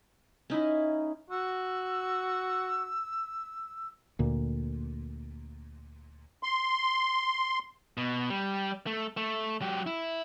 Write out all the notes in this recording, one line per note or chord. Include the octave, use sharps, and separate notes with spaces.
C#4 D#4 E4
F#4 E6
D2 A#2
C6
B2
G3
A3
A3
F#3 G4
E4